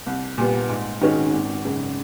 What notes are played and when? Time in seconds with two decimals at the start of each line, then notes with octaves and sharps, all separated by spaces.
0.06 C2
0.38 A#2 G3 B3
0.69 G#2
1.01 D#3 G#3 C#4 F#4
1.33 G#1
1.65 F#2 C#3